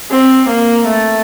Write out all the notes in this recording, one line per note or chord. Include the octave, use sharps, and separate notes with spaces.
C4
A#3
A3